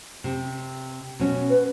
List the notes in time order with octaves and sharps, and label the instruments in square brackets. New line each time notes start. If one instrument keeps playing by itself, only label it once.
[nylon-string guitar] C3
B2 C#4
[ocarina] B4